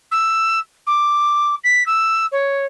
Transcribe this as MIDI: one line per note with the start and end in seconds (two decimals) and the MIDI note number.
0.11 0.59 88
0.87 1.55 86
1.64 1.83 95
1.86 2.26 88
2.32 2.65 73